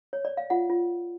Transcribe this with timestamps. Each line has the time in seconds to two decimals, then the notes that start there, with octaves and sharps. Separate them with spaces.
0.13 C#5
0.25 D5
0.37 F5
0.50 F4 F#5
0.70 F4